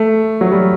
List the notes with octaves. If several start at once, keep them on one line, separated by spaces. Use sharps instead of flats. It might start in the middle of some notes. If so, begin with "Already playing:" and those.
Already playing: A3
F#3
G3